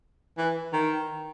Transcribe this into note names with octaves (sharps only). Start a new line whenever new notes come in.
E3
D#3